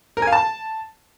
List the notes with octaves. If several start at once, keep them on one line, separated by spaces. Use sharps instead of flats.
A#4
G#5
F5
A5